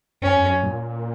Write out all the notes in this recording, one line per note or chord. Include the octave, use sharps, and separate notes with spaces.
F#2 C#4
F2
F#2
A#2